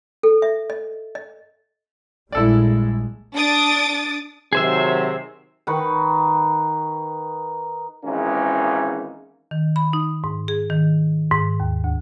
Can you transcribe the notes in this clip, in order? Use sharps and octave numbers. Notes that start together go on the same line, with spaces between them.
A4
E5
D#5
D#5
A#1 G3 G#3 E4 A4 D5
D4 D#6 A6 D7
C3 D#3 F#3 G#4 C5 E5
D#3 D#4 B4 C#6
G#1 G#2 E3 A#3 C#4
D#3
B5
D#4
G#2
G#4
D#3
G#2
D#2
D2